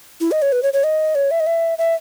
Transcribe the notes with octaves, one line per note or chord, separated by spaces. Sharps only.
E4
D#5
C#5
B4
C#5
C#5
D#5
C#5
E5
D#5
E5
E5